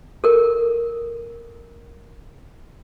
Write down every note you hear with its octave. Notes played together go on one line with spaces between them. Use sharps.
A4 A#4